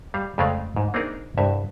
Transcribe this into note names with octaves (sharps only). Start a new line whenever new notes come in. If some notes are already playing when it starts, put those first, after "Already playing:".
G3 F5
F2 C#3 G#3 A3 D5 F5
G#2
A#3 C4 D4 D#4 G#4 A#4
C2 G2 E5